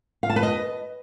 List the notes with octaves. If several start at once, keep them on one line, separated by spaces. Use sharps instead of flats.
F5
A5
B4
D#5